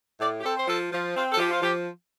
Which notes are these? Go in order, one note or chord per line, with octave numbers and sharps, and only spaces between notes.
A2 D5
G4
C4 A4
C5
F3 A4
F3
C4 F4
A4
F3 G4
F4
F3 G4